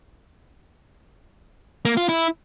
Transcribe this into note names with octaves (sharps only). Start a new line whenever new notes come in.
A#3
F4
E4